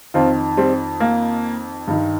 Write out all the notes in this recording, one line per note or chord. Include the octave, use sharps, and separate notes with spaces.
F2 D#3 C4 F4
G3 C4
A#3
G2 D#3